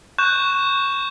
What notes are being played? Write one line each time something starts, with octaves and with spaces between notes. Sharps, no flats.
C#6 F#6 G6 E7